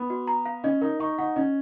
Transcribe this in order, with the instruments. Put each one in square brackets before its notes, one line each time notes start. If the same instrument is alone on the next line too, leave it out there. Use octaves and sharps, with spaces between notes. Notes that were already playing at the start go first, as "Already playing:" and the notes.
Already playing: [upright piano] B3
[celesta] F#4
A#5
F5
[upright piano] C#4 [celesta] D#5
[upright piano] D#4 [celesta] A#4
[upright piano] D#4 [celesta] C#6
[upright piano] D#4 [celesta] F#5
[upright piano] C#4 [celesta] D#5